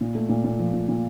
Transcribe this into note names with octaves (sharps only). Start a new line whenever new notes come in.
A#2
A3
A#2
A#2
F3
A#2
A#2